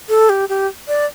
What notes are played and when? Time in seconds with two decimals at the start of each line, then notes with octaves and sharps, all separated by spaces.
0.09 A4
0.29 G4
0.49 G4
0.88 D5